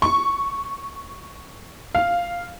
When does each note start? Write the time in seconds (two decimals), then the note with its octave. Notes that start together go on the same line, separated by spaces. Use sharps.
0.02 C#6
1.95 F5